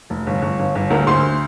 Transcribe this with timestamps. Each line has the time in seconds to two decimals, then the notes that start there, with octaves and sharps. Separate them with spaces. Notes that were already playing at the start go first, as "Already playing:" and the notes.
0.10 F1
0.27 G1
0.42 G1
0.59 G1
0.75 G1
0.90 D2 A#4 A#5
1.07 D2 C5 C6